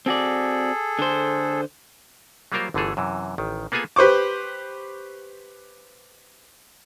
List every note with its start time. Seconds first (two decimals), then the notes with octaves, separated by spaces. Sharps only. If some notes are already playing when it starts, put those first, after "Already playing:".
0.06 C4 F#4 G#4 A4 D5
0.99 D3 C5
2.52 F#3 G3 A#3 F4 A#4 C5
2.74 G1 D3 E3 A3 G#4 A4
2.97 F#2 C3 E3
3.38 A1 D#3
3.72 A#3 B3 F4 G#4 A4 G#5
3.96 G4 B4 C5 C#6 D6